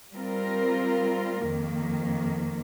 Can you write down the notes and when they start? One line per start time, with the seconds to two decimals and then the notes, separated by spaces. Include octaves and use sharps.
0.12 G3 C4 F4 A#4
1.43 F2 D#3 A#3